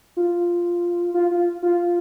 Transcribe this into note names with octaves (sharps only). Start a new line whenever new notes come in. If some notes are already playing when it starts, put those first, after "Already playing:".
F4
F4
F4
F4